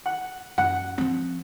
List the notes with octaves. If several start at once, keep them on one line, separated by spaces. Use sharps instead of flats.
F#5
F#2 F#5
F3 C4